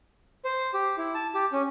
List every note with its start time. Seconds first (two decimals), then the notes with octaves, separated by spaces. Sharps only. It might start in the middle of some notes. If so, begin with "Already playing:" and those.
0.45 C5
0.74 G4
0.97 E4
1.15 A5
1.35 G4
1.52 C#4